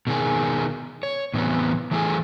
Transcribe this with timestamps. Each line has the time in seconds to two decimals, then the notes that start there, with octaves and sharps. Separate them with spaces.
0.07 B2 D#3 G#4
1.03 C#5
1.34 A2 C3 E3 B3
1.91 E3 A3 E4 G#4 A4 G#5